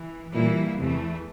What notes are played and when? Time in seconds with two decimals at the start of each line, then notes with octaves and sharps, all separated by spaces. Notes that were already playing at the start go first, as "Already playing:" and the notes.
Already playing: E3
0.33 A#2 E3 G3 A#3 E4
0.78 E2 C3 E3 A3